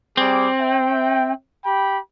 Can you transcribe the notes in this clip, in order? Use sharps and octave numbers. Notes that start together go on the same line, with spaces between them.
G3 C4 G#4 D6
E5 G5
G4 G5 B5